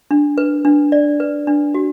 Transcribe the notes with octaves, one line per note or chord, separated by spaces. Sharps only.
D4
B4
D4
D5
B4
D4
F#4